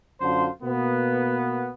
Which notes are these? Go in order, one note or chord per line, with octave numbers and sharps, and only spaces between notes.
F#2 D3 F4 C5
B2 A#3 B3